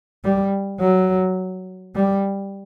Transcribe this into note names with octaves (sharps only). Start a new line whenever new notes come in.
G3
F#3
G3